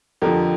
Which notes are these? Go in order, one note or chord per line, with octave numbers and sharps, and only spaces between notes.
F2 D3 F3 G4 A#4